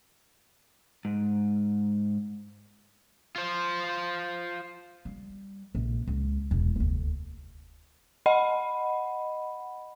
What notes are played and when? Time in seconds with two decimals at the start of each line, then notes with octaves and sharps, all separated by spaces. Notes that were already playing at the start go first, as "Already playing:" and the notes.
1.05 G#2
3.36 F4 C5
5.05 G3
5.75 A#1
6.07 C#2
6.51 E1 E4
6.76 F1 D2
8.26 D#5 F#5 B5